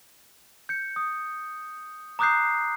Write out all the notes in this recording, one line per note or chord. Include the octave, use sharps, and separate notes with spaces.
G6 C#7
D#6
A#5 D6 D#6 F#6 G6 C7